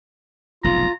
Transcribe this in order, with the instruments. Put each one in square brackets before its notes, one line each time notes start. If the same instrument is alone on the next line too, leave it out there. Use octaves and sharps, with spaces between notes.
[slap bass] F1 B1 G#2 [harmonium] F4 [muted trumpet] A#5